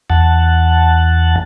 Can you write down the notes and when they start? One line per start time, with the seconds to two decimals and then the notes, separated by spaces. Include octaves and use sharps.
0.10 E2 F#5 A5